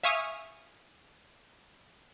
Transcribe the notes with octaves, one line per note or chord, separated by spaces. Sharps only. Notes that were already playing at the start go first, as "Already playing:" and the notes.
E5 F5 G#5 C#6 D#6 F6